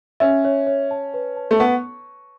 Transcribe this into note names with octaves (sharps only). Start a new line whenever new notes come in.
C#4 E5
C#5
C#5
A5
B4
A5
A3
B3 C#6